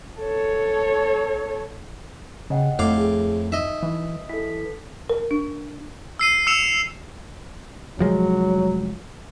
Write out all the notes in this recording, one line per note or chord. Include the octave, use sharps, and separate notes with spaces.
A4 C#5
C#3 D#5 F#5 G5
F2 A2 F5 D6
G#4
D#4 D#5 E5
E3
E3 A4 B6
A#4
D4
E6 C7 D#7
E6 C#7 E7 F7
F1 F3 F#3 G#3